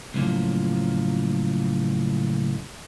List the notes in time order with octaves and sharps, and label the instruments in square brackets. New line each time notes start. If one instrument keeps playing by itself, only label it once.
[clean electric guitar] C#2 F#2 A2 F3 A#3